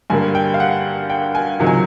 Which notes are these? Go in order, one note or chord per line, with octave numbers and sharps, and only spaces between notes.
G2 D3 G3 A#3 G#5
G5
F5
F#5
G5
G#5
C#2 C3 D#3 F#3
G#5